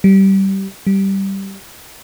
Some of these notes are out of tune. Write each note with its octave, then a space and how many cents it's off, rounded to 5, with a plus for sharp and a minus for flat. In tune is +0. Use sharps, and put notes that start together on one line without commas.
G3 -20
G3 -10